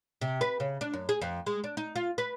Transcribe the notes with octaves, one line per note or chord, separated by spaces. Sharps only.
C3
B4
C#3
D4
F#2
G#4
F2
G#3
D4
D#4
F4
B4